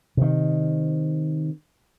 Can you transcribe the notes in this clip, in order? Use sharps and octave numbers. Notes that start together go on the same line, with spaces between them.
C3 D#3